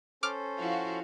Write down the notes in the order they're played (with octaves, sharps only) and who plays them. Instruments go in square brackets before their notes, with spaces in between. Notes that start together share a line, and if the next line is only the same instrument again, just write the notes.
[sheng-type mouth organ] C#4 A4 C5 [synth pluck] D6 F6
[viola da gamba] F3 E4 [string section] F#4 F5